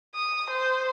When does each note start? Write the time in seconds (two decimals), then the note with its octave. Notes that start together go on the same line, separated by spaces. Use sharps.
0.15 D#6
0.50 C5